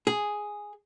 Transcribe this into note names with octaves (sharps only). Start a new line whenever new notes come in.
G#4